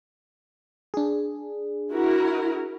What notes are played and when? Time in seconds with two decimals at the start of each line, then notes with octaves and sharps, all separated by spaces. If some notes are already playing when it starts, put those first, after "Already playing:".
0.94 D4 G#4
1.93 E4 F#4 A#4